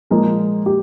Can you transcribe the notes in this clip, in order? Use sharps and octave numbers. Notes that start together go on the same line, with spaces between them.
A#2 F3 G#3 A#3 F4 A#4
G4